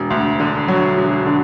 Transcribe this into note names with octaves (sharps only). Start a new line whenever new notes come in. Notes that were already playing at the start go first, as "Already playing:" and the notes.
Already playing: E1
D2
D3
F#3
E1
D3